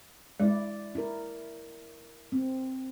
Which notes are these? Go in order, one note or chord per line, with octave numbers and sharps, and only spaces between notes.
G#3 E4 D5
E4 A#4
C4